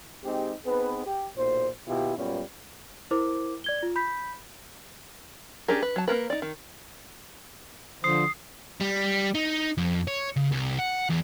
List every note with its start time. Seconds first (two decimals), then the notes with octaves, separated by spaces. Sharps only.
0.24 G#3 C4 D#4 G4
0.66 B3 C4 D#4 G#4 B4
1.05 G4
1.36 B1 A#2 C5
1.88 D#2 B2 E4 F4 G4
2.17 F#2 A#2 G3 B3 C#4 F4
3.11 E4 A#4 C5 D6
3.64 D5 G#6 G7
3.83 F4
3.96 B5 G6 B6
5.68 C#4 D4 G4 G#4 A#4
5.82 B4
5.96 F#3 A5
6.08 A#3 C#4 A#4 B4
6.30 D#4 D5
6.42 D#3
8.04 D3 F3 C5 D#6 C7
8.80 G3
9.35 D#4
9.78 F2
10.08 C#5
10.36 C#3
10.52 C2
10.79 F#5
11.10 E2